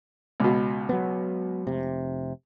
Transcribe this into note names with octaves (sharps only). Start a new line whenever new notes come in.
C#2 B2
F#3 B3
F1 C3